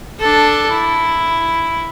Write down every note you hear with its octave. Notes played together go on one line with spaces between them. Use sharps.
D4 A4
E4